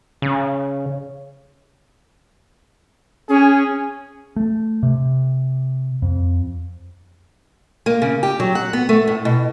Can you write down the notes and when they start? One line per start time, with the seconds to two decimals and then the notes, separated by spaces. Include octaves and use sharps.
0.22 C#3
3.29 C#4 G#4
4.36 A3
4.83 C3
6.02 F2
7.86 A#3
8.02 C#3
8.23 G4
8.40 F#3
8.55 F#5
8.73 B3
8.89 A3
9.08 A2
9.25 B2